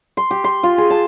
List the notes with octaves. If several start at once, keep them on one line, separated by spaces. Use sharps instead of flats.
C6
G4
C6
F4
G#4
A5